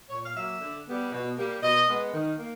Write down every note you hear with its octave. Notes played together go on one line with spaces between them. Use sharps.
A#2 C#5
F5
F#3 A#3 E5
D3
G3 B3
B2
G3 A#3
B2 D#5
G#3 B3
D#3
A#3